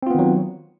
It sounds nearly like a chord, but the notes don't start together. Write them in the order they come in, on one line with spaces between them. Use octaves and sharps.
C4 F4 B3 D#3 F#3